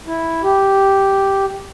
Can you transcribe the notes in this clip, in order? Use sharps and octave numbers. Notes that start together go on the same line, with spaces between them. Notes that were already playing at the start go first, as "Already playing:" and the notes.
E4
G4